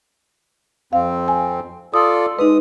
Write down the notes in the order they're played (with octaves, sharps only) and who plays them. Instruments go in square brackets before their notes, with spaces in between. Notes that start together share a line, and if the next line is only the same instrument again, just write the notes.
[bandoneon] F2 C4 [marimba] F5
[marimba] G#5
[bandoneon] F4 A4 D5 [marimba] D#6
[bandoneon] G#3 D#6 [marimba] D#4 B4